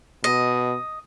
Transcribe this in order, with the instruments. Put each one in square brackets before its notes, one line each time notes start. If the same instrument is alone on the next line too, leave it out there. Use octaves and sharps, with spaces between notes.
[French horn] B2 [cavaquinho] D#5